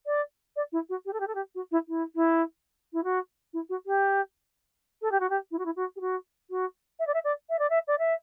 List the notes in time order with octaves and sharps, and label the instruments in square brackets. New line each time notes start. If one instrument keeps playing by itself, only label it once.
[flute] D5
D5
E4
F#4
G4
A4
G4
A4
G4
F#4
E4
E4
E4
E4
F#4
E4
F#4
G4
A4
G4
F#4
G4
E4
F#4
E4
F#4
G4
F#4
F#4
E5
D5
E5
D5
E5
D5
E5
D5
E5